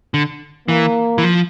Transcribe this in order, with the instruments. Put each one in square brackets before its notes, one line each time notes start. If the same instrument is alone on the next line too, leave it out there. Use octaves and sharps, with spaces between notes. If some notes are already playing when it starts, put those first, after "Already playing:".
[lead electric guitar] D3
[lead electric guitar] E3 [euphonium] A#3
[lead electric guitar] E3
F3